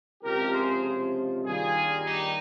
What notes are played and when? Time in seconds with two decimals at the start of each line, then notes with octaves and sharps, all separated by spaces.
0.23 C#2 C3 F3 G4 A#4
0.54 G#4 C5
1.44 G2 D#3 G3 A#3 F4 G#4
2.04 D#4 G4